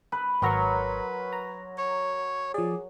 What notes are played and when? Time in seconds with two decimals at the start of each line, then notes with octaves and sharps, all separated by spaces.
0.12 B4
0.42 G#1 F#3 A#4 B4 A#5 C6 C#6
1.33 A#5
1.78 C#5
2.54 F3 G#4 D5